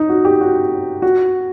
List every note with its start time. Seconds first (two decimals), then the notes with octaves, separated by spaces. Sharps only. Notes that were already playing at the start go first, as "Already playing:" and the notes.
Already playing: D#4
0.09 F#4
0.25 G4
0.41 F#4
1.02 F#4